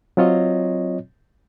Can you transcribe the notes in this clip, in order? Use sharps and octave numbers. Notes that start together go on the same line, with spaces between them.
F#3 C4 F4 C#5 D#5